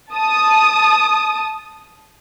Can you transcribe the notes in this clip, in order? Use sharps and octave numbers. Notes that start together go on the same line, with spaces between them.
A5 D#6